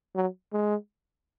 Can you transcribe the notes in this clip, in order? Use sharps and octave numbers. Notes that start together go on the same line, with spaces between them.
F#3
G#3